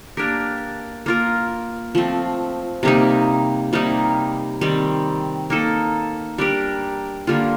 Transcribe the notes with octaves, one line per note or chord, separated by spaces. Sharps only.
A#3 D4 G4 A#4
A#3 F4 A#4
F3 A3 C4
C3 G3 A#3 D#4
C3 G3 A#3 D#4
D#3 G3 C4
A#3 D#4 A4
G3 D4 G4 A#4
D3 G3 A#3 F4